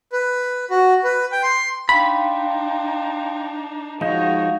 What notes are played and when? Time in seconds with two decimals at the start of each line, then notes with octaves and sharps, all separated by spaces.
0.13 B4
0.70 F#4
1.04 B4
1.32 G5
1.43 C6
1.89 D4 D#4 F5 G5 B5 C6
4.01 F3 G#3 D#4 F#4 C#5 F5